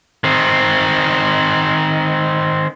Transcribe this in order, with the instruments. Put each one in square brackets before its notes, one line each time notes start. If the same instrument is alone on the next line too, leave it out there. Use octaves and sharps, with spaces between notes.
[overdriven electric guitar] D#3 C4